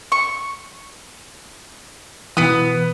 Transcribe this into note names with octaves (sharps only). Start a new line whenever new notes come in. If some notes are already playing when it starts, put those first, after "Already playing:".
C#6
B2 E3 B3 D#6